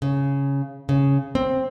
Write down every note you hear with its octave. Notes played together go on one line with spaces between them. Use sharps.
C#3
C#3
C4